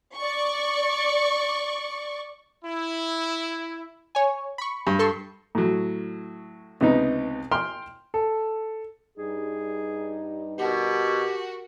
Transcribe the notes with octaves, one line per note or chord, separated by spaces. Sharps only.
D5 C#6
E4
C#5 G#5
B5 C#6
G2
A4 C6 C#6
A2 F#3
C#2 C3 B3 D#4
G5 C6 F6
A4
G2 G3 D#4 G#4
B2 F#4 G4 A#4